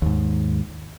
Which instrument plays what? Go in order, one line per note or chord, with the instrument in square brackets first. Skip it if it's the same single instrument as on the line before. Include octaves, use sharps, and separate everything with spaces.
[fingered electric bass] D#2 G#2